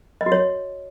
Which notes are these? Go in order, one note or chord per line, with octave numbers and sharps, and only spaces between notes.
D#5
F#4
C#5